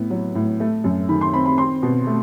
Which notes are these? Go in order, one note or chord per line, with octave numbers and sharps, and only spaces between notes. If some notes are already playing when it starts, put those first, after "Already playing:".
Already playing: A2 B3
F#3
A2
A3
F#2
D#3 B5
C6
C4 B5
B5
C4 C6
B2
A3